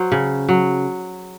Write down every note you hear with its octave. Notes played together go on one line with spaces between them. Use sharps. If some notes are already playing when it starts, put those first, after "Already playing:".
Already playing: F#3 C5
C#3
F#3